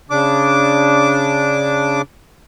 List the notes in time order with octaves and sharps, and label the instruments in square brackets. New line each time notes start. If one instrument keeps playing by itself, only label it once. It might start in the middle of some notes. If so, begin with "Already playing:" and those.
[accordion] C#3 D4 D6